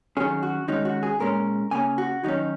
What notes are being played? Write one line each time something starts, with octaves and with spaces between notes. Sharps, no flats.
D#3 F#3 C#4 G#4
F#4
D#3 G#3 C#4 D#4
F#4
G#4
A#2 G#3 C#4 A#4
C#3 A#3 C#4 G#5
F#4
D#3 F#3 C#4 D#4